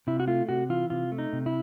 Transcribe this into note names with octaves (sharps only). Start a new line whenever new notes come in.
C3 E4
F#4
A3 F4
C3 F#4
E3 F4
C3 F4
A3
D#4
C3
E4